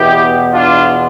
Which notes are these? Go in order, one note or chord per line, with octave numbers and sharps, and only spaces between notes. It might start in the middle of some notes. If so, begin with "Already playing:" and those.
Already playing: E2 B2 B3 E4 G4
D4 F4